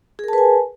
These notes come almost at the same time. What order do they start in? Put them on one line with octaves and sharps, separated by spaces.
G#4 A#4 A5 B4 G#5